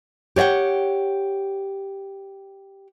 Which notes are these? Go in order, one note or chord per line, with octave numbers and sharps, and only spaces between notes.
G4 C#5 D5 F#5 G5